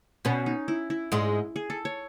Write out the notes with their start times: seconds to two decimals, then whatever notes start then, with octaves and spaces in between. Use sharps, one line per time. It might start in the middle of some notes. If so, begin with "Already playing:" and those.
0.25 B2 B3 C#4
0.46 D#4
0.68 E4
0.90 E4
1.12 G#2 G#3
1.56 G#4
1.70 A4
1.85 C#5